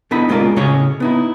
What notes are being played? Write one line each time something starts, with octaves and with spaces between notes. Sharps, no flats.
D3 B3 D#4 E4 D#5 B5
G3 G#3 C#4 F4 A#4 D5
A2 C#3 C#4 C#5 D#5 G#5
B3 D#4 E4